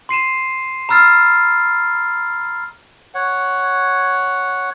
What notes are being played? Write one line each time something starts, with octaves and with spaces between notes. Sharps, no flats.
C6 C7 D#7 E7
A#5 B5 E6 F6 A6 C7
C#5 F#5